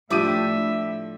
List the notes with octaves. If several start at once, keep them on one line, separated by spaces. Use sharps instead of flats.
A2 F3 D4 G4 E5 D6 D#7